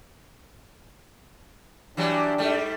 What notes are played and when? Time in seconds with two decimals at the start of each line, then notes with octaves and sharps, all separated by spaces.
1.97 E3 F#3 G3 D4 G4
2.38 G#2 G3 A3